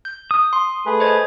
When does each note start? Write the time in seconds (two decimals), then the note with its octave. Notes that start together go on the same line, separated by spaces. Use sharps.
0.05 G6
0.31 D#6
0.53 C6
0.86 A3 G#4 B4
1.00 C5 D#5 G#6